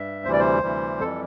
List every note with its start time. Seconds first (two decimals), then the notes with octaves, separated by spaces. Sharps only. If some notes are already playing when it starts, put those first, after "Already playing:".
Already playing: G2 E5
0.25 D2 C3 E3 G3 C5
0.33 D5
0.39 C5
0.63 D2 C3 E3 G3
1.01 F2 E3 G3 A4